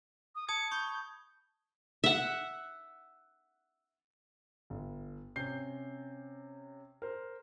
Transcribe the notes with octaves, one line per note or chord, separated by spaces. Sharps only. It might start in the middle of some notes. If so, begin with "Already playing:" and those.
D#6
A5 D#6 G#6 C#7
B5 C#6 G6 G7
E5 F#5
G1
C3 C#4 G6 C7
A#4 C5